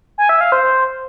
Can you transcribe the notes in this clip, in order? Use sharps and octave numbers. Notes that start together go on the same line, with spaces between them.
G#5
E5
F5
C5
C5